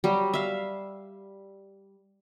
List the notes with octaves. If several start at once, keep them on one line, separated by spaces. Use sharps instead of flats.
F#3 G3
E5 F5